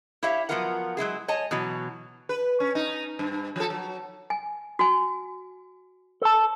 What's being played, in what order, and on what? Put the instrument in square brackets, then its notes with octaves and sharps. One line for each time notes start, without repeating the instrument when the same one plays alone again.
[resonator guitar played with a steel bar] E4 G4 C#5 E5 F5
F3 F#3 B3 F4 A#4 F#5
F#3 G#3 E4 G#4
C#5 D#5 G#5 A5
B2 E3 F#3
[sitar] B4
C#4
D#4
G2
F3 A4
F#3
[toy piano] G#5
F#4 G#5
[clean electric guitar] A4 A5